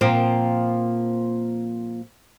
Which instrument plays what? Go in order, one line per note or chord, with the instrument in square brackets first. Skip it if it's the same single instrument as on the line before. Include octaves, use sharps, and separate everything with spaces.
[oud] A#2 F3 C4